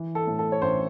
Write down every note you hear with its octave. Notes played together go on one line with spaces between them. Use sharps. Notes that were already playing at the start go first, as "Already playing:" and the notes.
Already playing: E3
A4
A2
A4
C#5
A1 C5